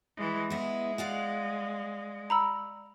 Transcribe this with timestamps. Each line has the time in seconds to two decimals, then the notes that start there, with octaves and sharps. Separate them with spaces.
0.17 E3 G#3
0.50 G#3 B3 E4
0.98 D5 F5 F#5
2.30 A#5 B5 E6